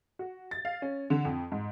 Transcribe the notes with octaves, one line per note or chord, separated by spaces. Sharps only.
F#4
A6
F5
C#4
D3
F2
G#2